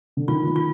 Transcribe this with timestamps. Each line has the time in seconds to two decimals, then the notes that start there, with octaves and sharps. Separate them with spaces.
0.17 D3
0.28 D#3 F4
0.47 D#3
0.56 F4